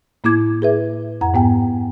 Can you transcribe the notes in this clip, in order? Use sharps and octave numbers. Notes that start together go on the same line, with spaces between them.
A2 A#3 E4 D6 G#6
G#4 B4 E5
F2 F#5 A#5
G#2 B3 G5 G#5